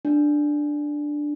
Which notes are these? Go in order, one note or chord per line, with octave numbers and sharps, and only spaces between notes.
D4